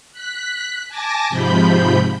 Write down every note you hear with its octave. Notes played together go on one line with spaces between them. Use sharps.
F#6 B6
G#5 A5 D6 A#6
G#2 C3 F3 B5 G6